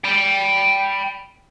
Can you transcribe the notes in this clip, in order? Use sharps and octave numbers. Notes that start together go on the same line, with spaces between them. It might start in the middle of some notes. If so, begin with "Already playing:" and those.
G5 B5